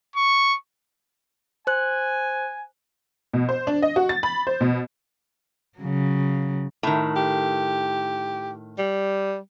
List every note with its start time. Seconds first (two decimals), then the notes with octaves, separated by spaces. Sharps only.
0.16 C#6
1.67 C5 G#5 F#6
3.34 B2
3.49 C5
3.67 D4
3.82 D#5
3.96 F#4
4.09 A6
4.23 B5
4.47 C5
4.61 B2
5.79 C#3 F#3
6.83 A2 D#3
7.16 G4
8.79 G3